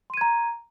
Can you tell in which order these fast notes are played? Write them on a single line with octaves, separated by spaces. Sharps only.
C6 D#7 G#6 A#5